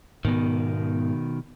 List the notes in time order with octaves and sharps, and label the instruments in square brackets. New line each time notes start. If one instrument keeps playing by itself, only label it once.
[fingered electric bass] G#2 B3 [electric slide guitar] B2 D#3